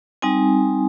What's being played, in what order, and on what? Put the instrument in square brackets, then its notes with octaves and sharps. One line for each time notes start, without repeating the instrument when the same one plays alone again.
[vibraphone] G3 C4 D#4 G#5